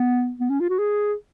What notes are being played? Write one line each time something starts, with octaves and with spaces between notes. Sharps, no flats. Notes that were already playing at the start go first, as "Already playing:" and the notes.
Already playing: B3
B3
C#4
F4
F#4
G#4